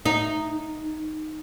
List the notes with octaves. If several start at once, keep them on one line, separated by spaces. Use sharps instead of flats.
D#4